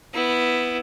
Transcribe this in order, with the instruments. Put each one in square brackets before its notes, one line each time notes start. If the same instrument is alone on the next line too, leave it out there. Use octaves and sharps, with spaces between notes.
[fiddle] B3 E4